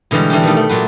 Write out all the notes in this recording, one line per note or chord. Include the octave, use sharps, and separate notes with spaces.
B2 D3 E3 G3 G#3
E3 G3 D4 G4
B2 D#3 A3
A3
A#2 F#3 B4